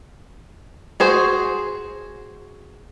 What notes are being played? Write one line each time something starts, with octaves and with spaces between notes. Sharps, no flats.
F#4 G#4 C5